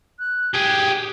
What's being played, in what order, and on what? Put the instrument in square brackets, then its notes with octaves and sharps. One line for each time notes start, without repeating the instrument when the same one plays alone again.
[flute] F#6
[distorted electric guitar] G4 G#4 [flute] G#6